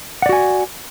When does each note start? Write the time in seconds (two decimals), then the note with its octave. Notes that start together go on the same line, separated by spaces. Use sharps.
0.22 F#5
0.26 D5
0.29 F#4
0.33 G#5